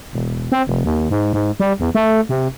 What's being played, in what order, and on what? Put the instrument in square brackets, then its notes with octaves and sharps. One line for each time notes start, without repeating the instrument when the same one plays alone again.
[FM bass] E1
C4
F1
D#2
G#2
G#2
G3
E2
A3
C3